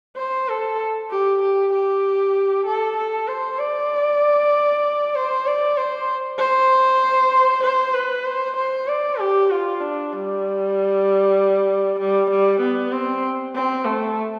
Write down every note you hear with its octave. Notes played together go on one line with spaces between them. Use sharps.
C5
A4
G4
G4
G4
A4
A4
C5
D5
C5
D5
C5
C5
C5
B4
C5
C5
D5
G4
F4
D4
G3
G3
G3
B3
C4
C4
A3